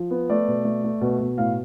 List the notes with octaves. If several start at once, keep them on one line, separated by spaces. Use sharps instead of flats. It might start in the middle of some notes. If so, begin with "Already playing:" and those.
Already playing: F3
B3
A3 D5
B2
A3
A3
B2
B2
A2 F5